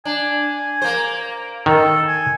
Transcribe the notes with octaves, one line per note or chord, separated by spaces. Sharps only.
D4 G#5
A#3 C5
D#3 A4
G#5